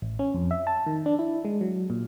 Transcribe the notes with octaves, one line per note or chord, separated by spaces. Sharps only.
A1
C#4
F2
E5
A5
D#3
D4
E4
G#3
F#3
A#2